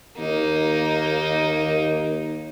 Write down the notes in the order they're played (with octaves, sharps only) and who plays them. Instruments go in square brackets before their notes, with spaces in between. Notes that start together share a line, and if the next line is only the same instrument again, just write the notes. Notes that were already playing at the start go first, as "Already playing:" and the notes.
[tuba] D#2 [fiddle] A#3 D#4